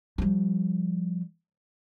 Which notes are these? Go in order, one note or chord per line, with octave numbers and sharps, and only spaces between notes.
F3 G3